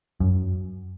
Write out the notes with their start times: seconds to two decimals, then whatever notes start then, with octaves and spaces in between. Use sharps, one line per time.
0.20 F#2